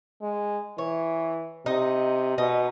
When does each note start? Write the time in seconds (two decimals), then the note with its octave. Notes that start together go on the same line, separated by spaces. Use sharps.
0.22 G#3
0.78 E3 C#5
1.66 C3 D#4
2.38 B2 D#4